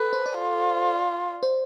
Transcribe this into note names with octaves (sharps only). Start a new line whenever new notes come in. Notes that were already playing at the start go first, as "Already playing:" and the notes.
Already playing: A4 B4
C5
D5
F4
C5